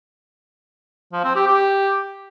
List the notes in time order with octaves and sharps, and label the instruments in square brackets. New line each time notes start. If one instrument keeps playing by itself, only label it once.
[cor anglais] F3
C4
G4
G4